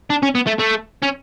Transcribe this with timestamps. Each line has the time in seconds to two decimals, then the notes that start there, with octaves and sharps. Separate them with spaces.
0.10 D4
0.23 C#4
0.35 B3
0.47 A3
0.59 A3
1.02 C#4